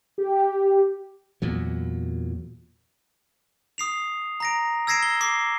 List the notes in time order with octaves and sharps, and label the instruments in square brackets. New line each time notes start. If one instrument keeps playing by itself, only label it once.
[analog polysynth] G4
[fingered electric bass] E2 A#2 F#3
[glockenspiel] D#6 C7 F7
A#5 A#6 D7
E6 G#6 A#6 C7 D7 E7
G7
D6 C7